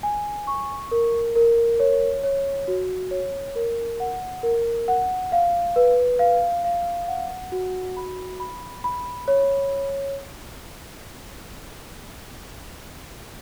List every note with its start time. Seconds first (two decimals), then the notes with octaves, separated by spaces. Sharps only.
0.03 G#5
0.47 C#6
0.91 A#4
1.36 A#4
1.80 C#5
2.23 C#5
2.68 F#4
3.11 C#5
3.55 A#4
4.00 F#5
4.43 A#4
4.88 F#5
5.32 F5
5.76 B4
6.19 F5
6.64 F5
7.08 F#5
7.52 F#4
7.97 B5
8.40 B5
8.84 B5
9.28 C#5